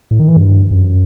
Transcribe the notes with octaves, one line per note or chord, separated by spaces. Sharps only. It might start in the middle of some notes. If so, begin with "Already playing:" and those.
A2
D#3
E3
G2
F#2